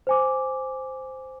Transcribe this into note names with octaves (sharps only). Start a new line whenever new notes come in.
C5 G#5 D6